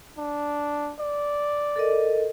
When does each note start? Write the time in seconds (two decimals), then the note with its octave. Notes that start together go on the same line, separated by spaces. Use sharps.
0.18 D4
1.00 D5
1.76 A4 A#4 D#5